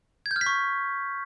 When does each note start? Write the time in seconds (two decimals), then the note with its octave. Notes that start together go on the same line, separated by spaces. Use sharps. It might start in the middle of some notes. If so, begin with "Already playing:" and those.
0.26 G#6
0.31 G6
0.36 F6
0.41 B6
0.46 C#6